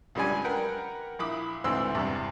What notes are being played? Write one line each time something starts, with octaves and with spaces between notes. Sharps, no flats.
C#2 F#2 G3 D4 G#5
A#4 B4 F#5 G5
A#1 E4 B5 D6 D#6
D2 G#2 E3 C4 C6 E6
E2 G2 C3